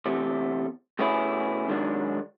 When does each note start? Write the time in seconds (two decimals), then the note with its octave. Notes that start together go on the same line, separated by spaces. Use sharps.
0.06 E2 C3 A3
0.99 B2 A3 B3 C#4 E4 G#4
1.69 G#2 D#3 F#3 G#3 D4